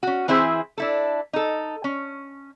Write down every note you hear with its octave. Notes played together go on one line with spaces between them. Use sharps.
C#4 F#4
E3 C4 E4 G#4 C5
D4 E4 A4
D#4 A4
C#4